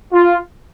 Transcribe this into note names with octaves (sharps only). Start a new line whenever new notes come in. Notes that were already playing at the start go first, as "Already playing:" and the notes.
F4